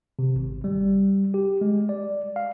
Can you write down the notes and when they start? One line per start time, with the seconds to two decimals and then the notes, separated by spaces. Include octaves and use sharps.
0.19 C3
0.36 G#1
0.64 G3
1.34 G4
1.61 G#3
1.89 D5
2.36 F5